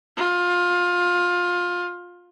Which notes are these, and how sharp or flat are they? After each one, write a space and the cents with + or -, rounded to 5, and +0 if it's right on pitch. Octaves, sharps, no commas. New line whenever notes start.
F4 +20